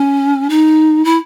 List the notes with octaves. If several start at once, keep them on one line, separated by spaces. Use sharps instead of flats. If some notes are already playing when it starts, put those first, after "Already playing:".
Already playing: C#4
D#4
E4